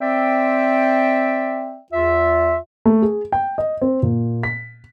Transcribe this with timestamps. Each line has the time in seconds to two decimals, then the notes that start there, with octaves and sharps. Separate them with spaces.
0.01 C4 D5 E5 G5
1.93 E2 F4 E5
2.86 A3
3.02 G#4
3.32 G5
3.58 D#5
3.82 C4
4.02 A#2
4.43 B6